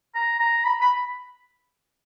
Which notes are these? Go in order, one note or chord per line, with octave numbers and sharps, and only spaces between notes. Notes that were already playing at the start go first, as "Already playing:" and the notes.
A#5
A#5
B5
B5